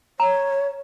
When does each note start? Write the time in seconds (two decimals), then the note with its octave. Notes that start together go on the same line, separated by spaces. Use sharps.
0.20 C#5 A#5